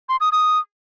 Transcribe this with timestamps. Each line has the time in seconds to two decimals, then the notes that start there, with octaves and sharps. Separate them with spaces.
0.09 C6
0.21 D#6
0.32 D#6